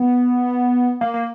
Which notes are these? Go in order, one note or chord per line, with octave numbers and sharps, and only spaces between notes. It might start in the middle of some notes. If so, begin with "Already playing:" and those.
Already playing: B3
A#3
A#3